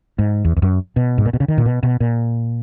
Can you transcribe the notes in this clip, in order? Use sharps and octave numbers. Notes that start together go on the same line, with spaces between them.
G#2
E2
E2
F#2
B2
G#2
A#2
B2
C#3
D#3
A#2
B2
B2
A#2